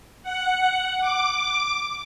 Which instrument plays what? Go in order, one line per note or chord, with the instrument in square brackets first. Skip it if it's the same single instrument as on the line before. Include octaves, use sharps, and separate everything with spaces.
[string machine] F#5
D6